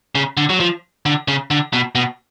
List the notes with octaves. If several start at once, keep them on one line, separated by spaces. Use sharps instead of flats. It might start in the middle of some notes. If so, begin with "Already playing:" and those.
C#3
D3
F#3
F3
D3
C#3
D3
B2
B2